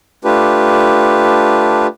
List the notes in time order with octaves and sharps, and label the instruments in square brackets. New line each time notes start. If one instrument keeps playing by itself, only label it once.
[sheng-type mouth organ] A3 D4 F4 G4 B4